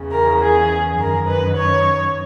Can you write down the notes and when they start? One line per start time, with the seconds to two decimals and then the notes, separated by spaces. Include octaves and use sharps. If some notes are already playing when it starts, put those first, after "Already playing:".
Already playing: E2 C#3 E3
0.11 A#4
0.40 G#4
0.99 F#2 D#3 A#4
1.28 B4
1.57 C#5